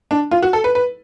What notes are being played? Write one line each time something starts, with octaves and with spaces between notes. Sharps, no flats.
D4
F4
F#4
A4
B4
B4